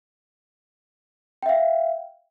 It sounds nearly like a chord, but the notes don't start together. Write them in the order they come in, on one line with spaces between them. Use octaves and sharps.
G5 E5 F5